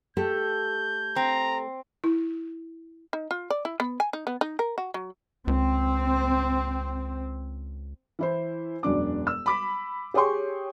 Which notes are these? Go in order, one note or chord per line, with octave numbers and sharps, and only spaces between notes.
A3 G4 A4 G6
C4 A#5
E4
D#4
F4
D5
E4
B3
G#5
D#4
B3
D#4
A#4
F#4
F#3
C#2 C4
E3 E4 C5
E1 F#2 D4 D6
E6
B5 D6 B6
G4 G#4 C#5 G5 C6 C#6